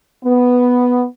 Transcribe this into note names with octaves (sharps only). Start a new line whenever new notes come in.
B3